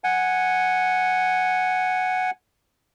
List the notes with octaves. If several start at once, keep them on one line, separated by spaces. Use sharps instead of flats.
F#5 G#5